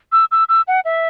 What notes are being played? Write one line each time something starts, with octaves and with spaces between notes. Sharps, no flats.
E6
E6
E6
F#5
E5